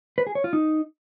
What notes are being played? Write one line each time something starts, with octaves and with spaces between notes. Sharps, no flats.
B4
G#4
C#5
F4
D#4